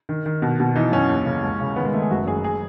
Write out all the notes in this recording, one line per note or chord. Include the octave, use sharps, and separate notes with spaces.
D#3
D#3
B2
B2
E3 D#4
F#2 C#4
D#2
C#3
C#2
C#3
D#3 B3
G#3
D#3 A3
G#4
F#1 F#4
F#2 G#4
G#4